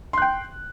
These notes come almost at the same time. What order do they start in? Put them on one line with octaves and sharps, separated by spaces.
C6 F#6 G5